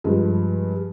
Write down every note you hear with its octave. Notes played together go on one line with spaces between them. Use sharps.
G2 F3 G#3